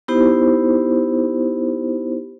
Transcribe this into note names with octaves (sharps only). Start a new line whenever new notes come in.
B3 D#4 E4 G4 C5